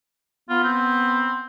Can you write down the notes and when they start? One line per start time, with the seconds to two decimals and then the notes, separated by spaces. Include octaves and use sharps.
0.49 B3 F4
0.64 C4